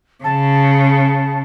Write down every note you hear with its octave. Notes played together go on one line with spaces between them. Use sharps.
C#3 A5